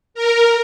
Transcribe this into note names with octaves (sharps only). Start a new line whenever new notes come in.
A#4